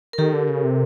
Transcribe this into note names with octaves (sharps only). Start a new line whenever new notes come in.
A#4
D#3 G4 A4
D3
C#3
C3